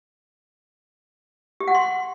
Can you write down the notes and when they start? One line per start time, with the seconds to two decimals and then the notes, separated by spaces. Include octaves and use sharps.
1.60 G4
1.68 F#5
1.75 C6